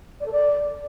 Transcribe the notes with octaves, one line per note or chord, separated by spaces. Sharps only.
D5
A4
D5